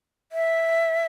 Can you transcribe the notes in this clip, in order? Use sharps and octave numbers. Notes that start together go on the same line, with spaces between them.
E5